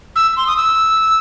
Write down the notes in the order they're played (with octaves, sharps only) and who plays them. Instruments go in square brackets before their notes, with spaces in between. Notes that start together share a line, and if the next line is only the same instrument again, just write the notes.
[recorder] E6
C6
D#6
E6